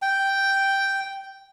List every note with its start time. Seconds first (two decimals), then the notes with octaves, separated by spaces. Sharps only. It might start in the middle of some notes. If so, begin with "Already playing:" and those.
0.02 G5